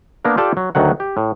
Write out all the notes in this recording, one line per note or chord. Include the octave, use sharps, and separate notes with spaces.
A#3 B3 D4 A#4
F4 G4 A4 D5 G5 A5
F#3
D2 D#3 F#3 F#5
G4
A2